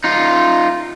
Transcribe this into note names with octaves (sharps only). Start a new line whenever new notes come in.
D#4 F4